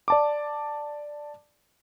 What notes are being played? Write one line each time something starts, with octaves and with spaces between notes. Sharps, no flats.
D5 A5 D6